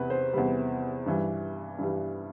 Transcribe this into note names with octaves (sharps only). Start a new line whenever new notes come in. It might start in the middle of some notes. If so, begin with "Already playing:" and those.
Already playing: E2 C3 B4
C5
E2 C3 G3 B4
G2 E3 G3
G2 E3 G3